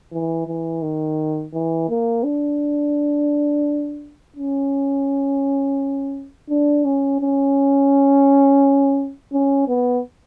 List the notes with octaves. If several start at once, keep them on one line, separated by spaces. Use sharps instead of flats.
E3
E3
D#3
E3
A#3
D4
C#4
D4
C#4
C#4
C#4
B3